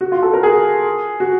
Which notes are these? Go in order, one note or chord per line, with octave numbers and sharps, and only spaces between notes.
F#4
F4
A4
A#4
G#4
F#4